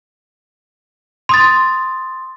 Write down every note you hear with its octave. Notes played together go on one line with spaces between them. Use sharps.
C6 D#6 A6